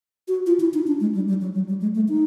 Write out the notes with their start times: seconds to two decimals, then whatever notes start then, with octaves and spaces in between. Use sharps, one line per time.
0.28 F#4
0.46 F4
0.60 E4
0.74 D#4
0.87 D4
1.01 G#3
1.15 G3
1.28 G3
1.41 F#3
1.55 F#3
1.69 G3
1.81 G#3
1.95 A3
2.09 D#4